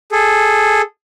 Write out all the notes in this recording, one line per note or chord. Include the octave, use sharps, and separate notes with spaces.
G#4 A4